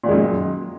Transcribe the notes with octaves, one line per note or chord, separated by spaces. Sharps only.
F#2 A#2 D#3 G#3